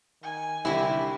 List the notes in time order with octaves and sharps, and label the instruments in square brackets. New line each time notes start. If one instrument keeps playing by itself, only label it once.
[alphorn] D#3 [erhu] G#5
[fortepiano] C2 D3 [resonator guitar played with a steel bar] C4 E4 [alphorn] G4